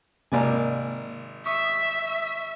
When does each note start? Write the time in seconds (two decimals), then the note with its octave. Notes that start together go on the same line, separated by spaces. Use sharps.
0.32 G#1 C3 A#3 A#4 D5 G#5
1.46 E5 C#6 D#6 E7